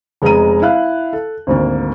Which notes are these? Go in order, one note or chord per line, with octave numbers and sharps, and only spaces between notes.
F1 G#3 B3 G#4 A#5 D#7
E4 F5 F#6
A4
G#1 D2 A#3